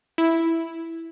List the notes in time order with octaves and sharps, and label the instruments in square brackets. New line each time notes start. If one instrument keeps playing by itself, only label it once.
[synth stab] E4